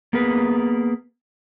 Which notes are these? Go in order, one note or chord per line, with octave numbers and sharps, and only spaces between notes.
A#3 B3 G#4 A#4 B4